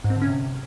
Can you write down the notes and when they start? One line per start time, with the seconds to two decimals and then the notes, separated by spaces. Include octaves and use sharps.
0.04 G#2
0.10 C4
0.16 D3
0.22 C#4
0.27 C3